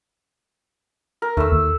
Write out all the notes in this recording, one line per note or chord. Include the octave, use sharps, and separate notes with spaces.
A#4
D#2 A3 E6
D#2